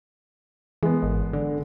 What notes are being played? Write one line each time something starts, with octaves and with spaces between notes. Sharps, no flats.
E3 G#3 B3
G#1
D3